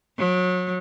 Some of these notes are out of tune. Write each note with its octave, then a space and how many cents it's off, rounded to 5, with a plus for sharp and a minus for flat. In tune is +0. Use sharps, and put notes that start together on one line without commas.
F#3 -30